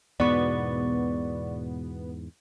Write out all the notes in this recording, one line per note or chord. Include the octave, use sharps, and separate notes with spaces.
E2 G#2 B2 B3 D5 C#6